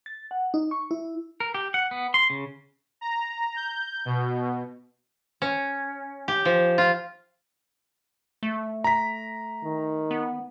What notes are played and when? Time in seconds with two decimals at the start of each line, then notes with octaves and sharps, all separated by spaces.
0.06 A6
0.31 F#5
0.54 D#4
0.71 C#6
0.91 E4
1.40 A#4
1.54 G4
1.74 F#5
1.91 B3
2.14 C6
2.30 C#3
3.01 A#5
3.56 G6
4.05 B2
5.42 C#4
6.28 G4
6.45 F3
6.78 F4
8.43 A3
8.84 A#5 B6
9.64 D#3
10.11 B3